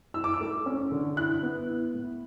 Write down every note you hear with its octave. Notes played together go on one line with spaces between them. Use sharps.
E4 E6
D6
E6
A3
C#4
D3
E4 F#6
B3
E4
A2